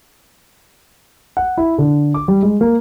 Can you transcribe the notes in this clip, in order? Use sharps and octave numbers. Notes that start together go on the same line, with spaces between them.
F#5
E4
D3
D6
G3
G#3
A#3